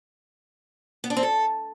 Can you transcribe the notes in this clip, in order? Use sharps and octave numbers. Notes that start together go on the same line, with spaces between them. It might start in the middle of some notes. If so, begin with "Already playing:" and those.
B3
D4
C4
A4